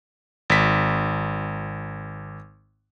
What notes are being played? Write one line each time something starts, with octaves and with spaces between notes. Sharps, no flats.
G#1 B6